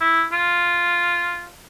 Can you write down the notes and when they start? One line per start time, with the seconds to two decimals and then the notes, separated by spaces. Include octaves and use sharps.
0.01 E4
0.32 F4